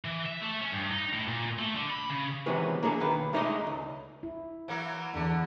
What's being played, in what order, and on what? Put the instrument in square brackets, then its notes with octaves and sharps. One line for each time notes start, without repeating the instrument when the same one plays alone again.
[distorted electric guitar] E3
E5
A3
C#4
G2
D#4
A2
A#2
A3
D3
B5
C#3
[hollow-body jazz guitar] C3 D#3 E3 F#3 G#3 B3
A#3 D4 G#4 A4
B1 D#3 B4
G#3 A3 D#4 B4 D5 D#5
C#2
[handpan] E4
[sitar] E3 F#3 A#3
[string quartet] E2 [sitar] D3